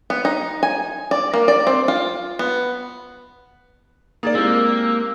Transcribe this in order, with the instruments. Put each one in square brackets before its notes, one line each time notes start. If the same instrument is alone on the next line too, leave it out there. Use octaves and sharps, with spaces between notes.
[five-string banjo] B3
D#4
G#5
D5
A#3
D5
C4
F4
B3
[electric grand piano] A#3 G#4 D5 [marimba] D#4 A#5 A6
[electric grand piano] G#3 C4 G4 [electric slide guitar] A#3 [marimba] E4 A#4 [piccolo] E6